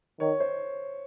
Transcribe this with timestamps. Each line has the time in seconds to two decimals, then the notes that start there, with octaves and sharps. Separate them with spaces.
0.20 D#3 C#5
0.40 C5